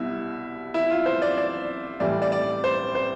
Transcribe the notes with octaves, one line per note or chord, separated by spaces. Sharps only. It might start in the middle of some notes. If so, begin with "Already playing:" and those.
Already playing: C2 B2 G3 E4
E4
F4
C5
D5
D5
A2 E3 G3 D5
D5
D5
C5
C5